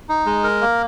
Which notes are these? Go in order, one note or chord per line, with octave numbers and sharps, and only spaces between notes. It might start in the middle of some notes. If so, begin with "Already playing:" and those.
D#4
G#3
A#4
A#3